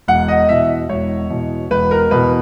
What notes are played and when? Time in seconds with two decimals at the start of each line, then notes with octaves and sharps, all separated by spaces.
0.08 E1 F#5
0.28 D#5
0.49 E2 B2 E5
0.89 E1 C#5
1.30 E2 B2
1.71 E1 B4
1.91 A#4
2.11 E2 B2 B4